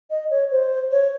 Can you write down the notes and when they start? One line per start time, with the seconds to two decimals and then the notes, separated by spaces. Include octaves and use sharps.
0.10 D#5
0.30 C#5
0.51 C5
0.91 C#5